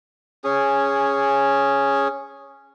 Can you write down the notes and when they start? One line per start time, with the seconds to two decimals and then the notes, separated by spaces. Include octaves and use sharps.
0.44 C#4 G#4